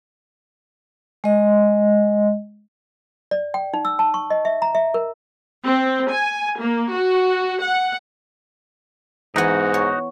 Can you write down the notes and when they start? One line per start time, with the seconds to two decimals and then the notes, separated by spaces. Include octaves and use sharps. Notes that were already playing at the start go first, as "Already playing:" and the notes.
1.24 G#3 D#5
3.31 D5
3.54 G5
3.74 D#4
3.85 E6
3.99 A5
4.14 C#6
4.30 D#5
4.45 E5
4.62 A#5
4.75 E5
4.94 A#4
5.63 C4
6.10 G#5
6.58 A#3
6.91 F#4
7.60 F#5
9.36 G#2 E3 B3 D#4 F#4
9.74 C#5